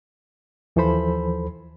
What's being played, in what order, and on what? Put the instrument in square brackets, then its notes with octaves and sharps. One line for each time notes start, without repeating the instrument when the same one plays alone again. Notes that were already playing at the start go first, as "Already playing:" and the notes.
[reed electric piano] D#2 E3 F3 A4 C5 B5